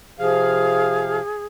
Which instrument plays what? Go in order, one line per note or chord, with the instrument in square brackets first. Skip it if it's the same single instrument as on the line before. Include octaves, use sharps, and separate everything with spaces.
[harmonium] C3 F3 F5 [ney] G#4